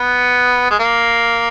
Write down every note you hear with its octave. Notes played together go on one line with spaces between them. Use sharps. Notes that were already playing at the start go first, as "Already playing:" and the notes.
Already playing: B3
G#3
A#3